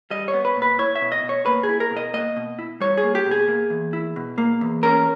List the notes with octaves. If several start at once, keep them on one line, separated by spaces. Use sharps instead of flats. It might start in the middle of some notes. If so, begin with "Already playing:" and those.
G3 D#5
C#5
B3
B4
A#2
B4
E4 C#5
E5
B2
D#5
B2
C#5
A#3 B4
G#4
E4
A#4
B2
D#5
A#3 D#5
B2
E4
G3 C#5
G#4
A#3
G4
B2
G#4
A#3
E2
E4
B2
A#3
E2
C#4 A#4